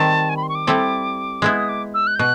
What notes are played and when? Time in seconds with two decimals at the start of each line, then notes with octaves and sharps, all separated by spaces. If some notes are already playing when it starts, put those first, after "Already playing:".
Already playing: D#3 G3 C4 A5
0.29 G#5
0.37 B5
0.43 C6
0.49 C#6
0.55 D6
0.67 G3 C4 E4 A4
1.42 G#3 B3 E4 D#6
1.57 D#6
1.69 D6
1.94 E6
2.07 F#6
2.15 G6
2.19 B2 F#6